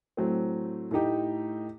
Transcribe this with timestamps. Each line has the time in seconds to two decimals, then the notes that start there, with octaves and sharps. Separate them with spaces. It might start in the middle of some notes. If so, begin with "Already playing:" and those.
0.17 A2 F#3 A3 C4
0.91 A2 A3 D#4 G4